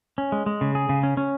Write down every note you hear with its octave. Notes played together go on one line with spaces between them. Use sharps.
C#4
G#3
G#3
C#3
G#4
C#3
C#4
C#4